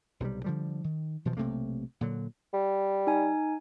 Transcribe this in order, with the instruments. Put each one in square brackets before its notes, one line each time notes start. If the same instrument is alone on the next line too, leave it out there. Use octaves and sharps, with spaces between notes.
[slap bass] B1 C3 E3 G3
D3 F3 G3
D#3
B2 E3 F3
B1 C3 A3 A#3
A#2 D3 F#3
[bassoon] G3
[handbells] D#4 G#5